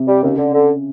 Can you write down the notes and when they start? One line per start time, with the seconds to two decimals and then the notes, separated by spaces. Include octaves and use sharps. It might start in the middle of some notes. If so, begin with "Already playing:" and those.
Already playing: C3
0.08 G3
0.23 D#2 C#3
0.38 D3
0.54 D3